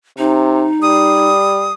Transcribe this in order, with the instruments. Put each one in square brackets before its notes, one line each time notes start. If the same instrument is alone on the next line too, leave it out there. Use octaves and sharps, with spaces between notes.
[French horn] C3 [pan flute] D#4
[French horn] G3 [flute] D#6